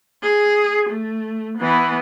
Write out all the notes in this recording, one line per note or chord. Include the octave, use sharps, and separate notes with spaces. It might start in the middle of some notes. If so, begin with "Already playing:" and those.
G#4
A3
E3 B3